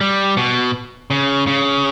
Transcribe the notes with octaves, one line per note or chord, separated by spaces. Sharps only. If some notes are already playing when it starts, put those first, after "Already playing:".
G3
B2
C#3
C#3